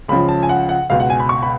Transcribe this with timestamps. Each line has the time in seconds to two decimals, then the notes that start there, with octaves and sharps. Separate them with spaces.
0.08 C#2 C#3 F3 B5
0.29 A5
0.43 G#5
0.49 F#5
0.69 F#5
0.90 C#2 B2 F5
1.00 F#5
1.10 G#5
1.20 B5
1.29 C#6
1.43 B5